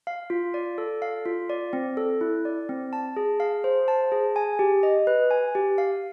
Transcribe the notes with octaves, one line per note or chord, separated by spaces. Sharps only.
F5
F4
D5
A4
F5
F4
D5
C4
A4
E4
D5
C4
A5
G#4
F5
C5
A5
G#4
G#5
G4
D#5
B4
G#5
G4
F5